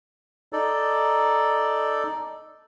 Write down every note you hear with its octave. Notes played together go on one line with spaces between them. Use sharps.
D#4 A4 D5